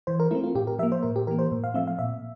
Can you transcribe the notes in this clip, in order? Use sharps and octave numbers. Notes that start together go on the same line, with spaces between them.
E3 C5
A#4
A3 C4 E4
F4
A2 G4
A#4
F3 A#3 E5
C5
A2 A#4
G4
E3 A#3 A#4
C5
A2
F5
F3 A3 C4 E5
F5
A#2 E5